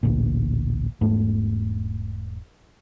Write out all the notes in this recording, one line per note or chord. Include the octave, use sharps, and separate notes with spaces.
A1 D2 A#2
E1 G#2 A3